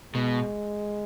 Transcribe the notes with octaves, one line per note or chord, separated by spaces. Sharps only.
B2 G#3